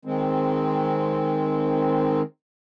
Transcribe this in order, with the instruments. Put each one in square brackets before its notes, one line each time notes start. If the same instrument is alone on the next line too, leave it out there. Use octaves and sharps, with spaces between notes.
[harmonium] D#3 G#3 C4